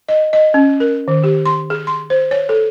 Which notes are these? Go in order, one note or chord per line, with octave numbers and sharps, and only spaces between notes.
D#5
D#5
C#4
A#4
D#3
G4
C6
G#4
C6
C5
C#5
A4